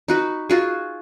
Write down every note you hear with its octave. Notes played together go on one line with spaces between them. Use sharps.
D#4 F#4 B4
F4 F#4 G#4